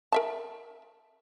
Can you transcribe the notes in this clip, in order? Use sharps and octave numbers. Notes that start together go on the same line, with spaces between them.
A#4 E5 A5